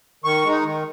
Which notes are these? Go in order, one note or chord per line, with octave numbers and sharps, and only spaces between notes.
D#3 C#6
G#3 D#4
D#3